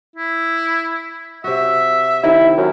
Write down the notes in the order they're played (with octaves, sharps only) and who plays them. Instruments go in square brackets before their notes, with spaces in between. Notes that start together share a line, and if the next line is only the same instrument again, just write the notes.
[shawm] E4
[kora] C3 F#4 [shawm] E5
[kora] C3 D#3 [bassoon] E4
[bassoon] F#2